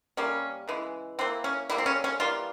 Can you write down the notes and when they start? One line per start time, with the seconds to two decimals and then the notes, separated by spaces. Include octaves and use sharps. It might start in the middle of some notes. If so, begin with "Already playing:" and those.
0.17 C3 G3 A#3 C#4
0.68 C#3 E3 G#3
1.19 E3 A#3 C4
1.44 C#4
1.70 C#3 G3 A#3 E4
1.78 C4
1.86 C#4
2.04 C#4
2.20 E3 G3 A#3 F4